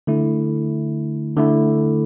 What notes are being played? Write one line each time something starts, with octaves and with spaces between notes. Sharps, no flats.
D3 A3 E4
D3 A3 E4